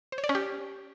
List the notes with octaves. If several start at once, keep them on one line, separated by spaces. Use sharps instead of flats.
C5
C#5
D5
C#4
G4